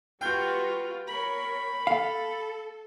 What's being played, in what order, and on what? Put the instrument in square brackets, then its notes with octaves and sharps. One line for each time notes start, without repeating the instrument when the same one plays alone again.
[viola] G3 F#4 [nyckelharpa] F4 B4 [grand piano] G5 G6
[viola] A#4 C#5 [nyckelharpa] B5
[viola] A4 [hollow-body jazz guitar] F5